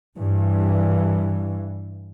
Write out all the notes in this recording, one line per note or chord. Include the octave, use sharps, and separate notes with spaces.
G2 E3